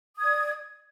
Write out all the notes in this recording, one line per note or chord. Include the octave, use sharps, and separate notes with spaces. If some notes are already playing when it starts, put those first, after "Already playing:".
D5 D#6 G#6